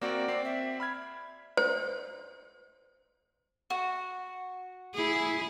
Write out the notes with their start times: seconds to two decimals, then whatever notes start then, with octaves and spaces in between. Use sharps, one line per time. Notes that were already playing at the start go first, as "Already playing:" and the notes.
0.02 A#3 C4 F#4 D5
0.28 C4 C7
0.45 E5
0.80 B5 F6 G#6
1.57 C5
3.70 F#4
4.94 E4 G#4